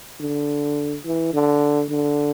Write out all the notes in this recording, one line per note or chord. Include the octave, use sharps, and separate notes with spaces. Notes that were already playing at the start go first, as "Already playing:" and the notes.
D3
E3
D3
D3